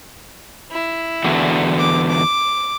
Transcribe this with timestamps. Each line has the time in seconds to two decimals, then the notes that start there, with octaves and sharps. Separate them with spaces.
0.71 E4
1.24 E2 D3 F#4
1.79 D6
2.09 D6